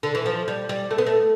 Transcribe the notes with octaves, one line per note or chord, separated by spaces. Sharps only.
D3
E3
F3
G3
G3
A3
B3
A3